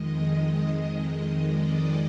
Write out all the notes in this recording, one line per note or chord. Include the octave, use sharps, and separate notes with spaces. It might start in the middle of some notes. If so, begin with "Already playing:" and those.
Already playing: F2 D#3 G#3 D#5
D#5
D5